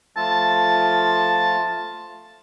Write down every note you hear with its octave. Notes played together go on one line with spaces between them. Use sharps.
F3 A3 F4 A5